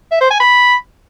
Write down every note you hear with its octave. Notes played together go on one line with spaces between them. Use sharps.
E5
C5
G#5
B5